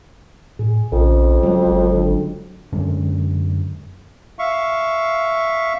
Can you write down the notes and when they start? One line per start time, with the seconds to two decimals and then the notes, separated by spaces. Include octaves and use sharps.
0.59 A2 G#4
0.92 A#1 F2 C#3
1.43 F#3 G#3
1.66 G1
1.95 D3
2.72 F#2 D3 G#3 C#4
4.39 E5 F5 C#6